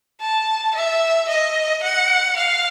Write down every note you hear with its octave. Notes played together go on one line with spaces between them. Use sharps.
A5
E5
D#5
F#5
F5